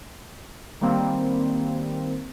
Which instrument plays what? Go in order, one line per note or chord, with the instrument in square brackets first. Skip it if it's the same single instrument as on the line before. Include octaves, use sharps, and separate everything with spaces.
[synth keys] D#3 G3 A#3 C4